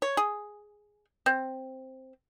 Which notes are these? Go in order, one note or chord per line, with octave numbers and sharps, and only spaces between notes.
C#5
G#4
C4